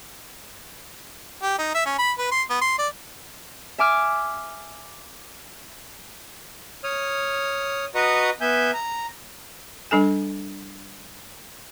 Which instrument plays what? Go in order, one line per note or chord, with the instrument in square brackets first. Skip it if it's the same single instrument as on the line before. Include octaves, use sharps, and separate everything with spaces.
[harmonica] G4
D#4
E5
C#4
B5
B4
C6
B3
C6
D5
[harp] E5 G#5 D6 F6
[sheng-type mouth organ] C#5 D#6 F6
F#4 B4 D#5 A#5 C#6 D#6
B3 E5 G#5 G6
A#5
[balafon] G3 D4 A4 G#5